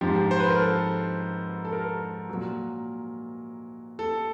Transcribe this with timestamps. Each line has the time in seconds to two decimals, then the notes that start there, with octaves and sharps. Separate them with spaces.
0.01 G#2 F3 G4
0.31 C5
0.40 B4
0.49 A#4
0.59 A4
1.65 A4
1.72 A#4
2.29 A#2 F#3
3.99 A4